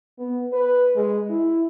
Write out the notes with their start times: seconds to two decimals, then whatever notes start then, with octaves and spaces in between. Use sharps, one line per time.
0.18 B3
0.53 B4
0.95 G#3
1.29 E4